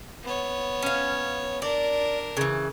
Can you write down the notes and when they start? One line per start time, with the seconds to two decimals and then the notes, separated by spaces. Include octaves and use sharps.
0.23 B3 C#5
0.82 C#4 F5
1.62 D4 A#4 D5
2.37 C#3 E3